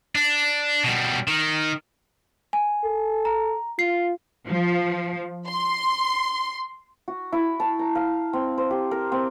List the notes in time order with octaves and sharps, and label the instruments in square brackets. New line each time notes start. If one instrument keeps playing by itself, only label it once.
[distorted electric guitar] D4
B2 G3
D#3
[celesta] G#5
[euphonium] A4
[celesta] A#5
[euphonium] F4 [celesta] C7
[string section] F3
C6
[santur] F#4
E4
A5
A#5
F5
C4
C5
G4
A#4
C4